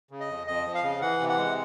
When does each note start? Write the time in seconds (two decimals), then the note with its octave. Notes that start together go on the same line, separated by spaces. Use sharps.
0.11 C#3
0.20 D#5
0.29 F2
0.47 F2 D#5
0.65 F3
0.75 F5
0.83 C#3
1.01 E3 F#5
1.20 C3
1.29 F#5
1.38 G#3